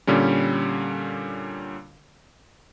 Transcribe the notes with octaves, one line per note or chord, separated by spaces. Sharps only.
A#2 D3 G3 C#4